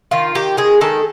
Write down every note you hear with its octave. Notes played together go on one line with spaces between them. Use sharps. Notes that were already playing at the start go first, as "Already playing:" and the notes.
D#3 F4
D#3 G4
G#3 G#4
D#3 A4